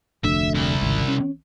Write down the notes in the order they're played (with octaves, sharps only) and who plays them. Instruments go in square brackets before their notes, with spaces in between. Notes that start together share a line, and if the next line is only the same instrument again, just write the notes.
[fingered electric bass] F1 D2 D3 [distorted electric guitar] E5
[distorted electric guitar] C2 E4
[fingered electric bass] G#1 C#2
C#4